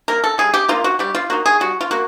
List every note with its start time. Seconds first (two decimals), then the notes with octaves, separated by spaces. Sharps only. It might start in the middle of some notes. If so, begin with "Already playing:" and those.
0.08 A#3 D#4 A#4
0.24 A4
0.38 G3 G#4
0.54 G4
0.68 A#3 D#4 F4
0.84 F#4
0.99 G3 G4
1.15 F4
1.30 A#3 D#4 F#4
1.46 G#4
1.60 G3 F#4
1.81 F4
1.91 A#3 F#4